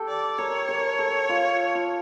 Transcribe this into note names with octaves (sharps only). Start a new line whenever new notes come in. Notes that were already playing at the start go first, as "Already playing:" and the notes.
Already playing: G4 A4
D5
A#4 C#5
A#4
A4
F4
F4